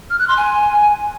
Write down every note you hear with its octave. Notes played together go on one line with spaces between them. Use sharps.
F6
F#6
C6
G#5